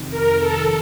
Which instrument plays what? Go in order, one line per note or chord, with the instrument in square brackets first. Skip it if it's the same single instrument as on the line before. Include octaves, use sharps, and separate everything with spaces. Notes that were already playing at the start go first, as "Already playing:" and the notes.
Already playing: [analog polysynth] F2 C3 D#3
[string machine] A#4
A4